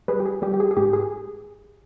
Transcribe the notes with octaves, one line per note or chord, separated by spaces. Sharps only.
G3 G#4 B4
G4
G#4
G3 G4
G4
G#4
G#4
G#2 G4
G#4